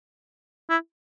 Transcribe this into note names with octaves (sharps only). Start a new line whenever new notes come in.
E4